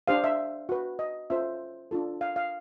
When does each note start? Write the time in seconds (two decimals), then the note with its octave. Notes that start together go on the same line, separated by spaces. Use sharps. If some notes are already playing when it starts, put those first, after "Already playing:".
0.08 D4 G4 C5 F5
0.24 E5
0.69 F#4 B4
0.99 D#5
1.30 C#4 F4 A4 C5 E5
1.91 D4 F4 A4
2.21 F5
2.36 F5